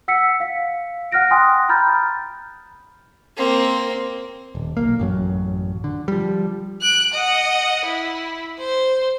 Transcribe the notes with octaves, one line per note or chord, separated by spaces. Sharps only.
F#5 E6 B6 C#7
F5 B6
F#5 F6 F#6 A#6 D7
G5 G#5 C6 D#6 F#6
A#5 B5 F6 G6 A6
A#3 C4
D#1
B1 F2 A#3
A1 F#2 F#3
D3
F3 G3
F#6 D7
D#5 F#5
E4
C5